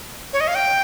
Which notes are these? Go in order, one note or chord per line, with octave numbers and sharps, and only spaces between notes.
C#5
D#5
F5
G5